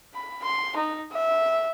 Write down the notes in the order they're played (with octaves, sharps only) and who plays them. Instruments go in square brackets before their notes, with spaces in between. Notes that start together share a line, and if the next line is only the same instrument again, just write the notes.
[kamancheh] B5
C6
D#4
E5